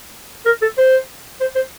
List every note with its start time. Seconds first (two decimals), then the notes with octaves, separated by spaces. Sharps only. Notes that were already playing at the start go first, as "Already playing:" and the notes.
0.46 A#4
0.62 A4
0.78 C5
1.41 C5
1.56 C5